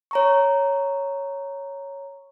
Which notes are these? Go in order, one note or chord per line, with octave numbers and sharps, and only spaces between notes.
C#5 A#5 C#6